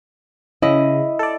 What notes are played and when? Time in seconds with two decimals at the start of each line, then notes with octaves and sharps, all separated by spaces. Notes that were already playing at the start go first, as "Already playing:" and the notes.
0.62 C#3 E4 D#5
1.19 A4 D5